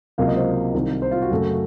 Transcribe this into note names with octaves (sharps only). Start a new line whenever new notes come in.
C#2 C3 F#3 A#3 F5
D#5
C5
C2 C3 D#3
C5
F4
F#4
F#2 C#3 A3